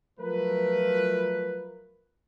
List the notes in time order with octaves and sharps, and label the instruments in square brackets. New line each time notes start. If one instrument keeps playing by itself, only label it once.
[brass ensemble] F3 F#3 A3 F4 A#4 B4